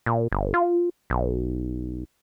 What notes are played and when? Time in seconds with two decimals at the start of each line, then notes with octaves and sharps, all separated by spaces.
0.06 A#2
0.32 G1
0.54 F4
1.10 B1